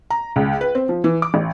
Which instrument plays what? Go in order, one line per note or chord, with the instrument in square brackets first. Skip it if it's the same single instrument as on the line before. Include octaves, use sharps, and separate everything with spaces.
[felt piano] A#5
C#2
B4
C4
F3
E3
D6
A1